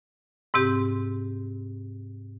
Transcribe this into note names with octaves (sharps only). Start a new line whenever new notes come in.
G#2 C3 C4 G4